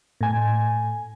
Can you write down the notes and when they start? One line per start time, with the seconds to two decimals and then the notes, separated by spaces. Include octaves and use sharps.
0.21 A2 G#5